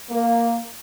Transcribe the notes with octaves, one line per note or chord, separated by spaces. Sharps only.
A#3